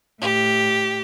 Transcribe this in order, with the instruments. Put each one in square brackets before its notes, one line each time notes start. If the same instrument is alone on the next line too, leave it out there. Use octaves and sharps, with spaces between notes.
[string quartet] A2 G4